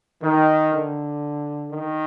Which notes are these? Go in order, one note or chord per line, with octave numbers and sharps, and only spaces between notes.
D#3
D3
D#3